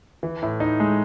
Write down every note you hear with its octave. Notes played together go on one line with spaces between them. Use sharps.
E3
A2
D#4
G#3